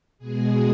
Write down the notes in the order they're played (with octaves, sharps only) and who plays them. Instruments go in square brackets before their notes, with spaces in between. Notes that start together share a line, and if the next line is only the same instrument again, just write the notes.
[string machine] B2 G#3 G#4